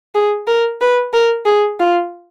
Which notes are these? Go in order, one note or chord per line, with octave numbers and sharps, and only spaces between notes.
G#4
A#4
B4
A#4
G#4
F4